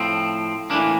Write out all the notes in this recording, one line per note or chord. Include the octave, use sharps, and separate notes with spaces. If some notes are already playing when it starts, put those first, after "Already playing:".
Already playing: A2 F3 C4
A2 E3 A#3 D4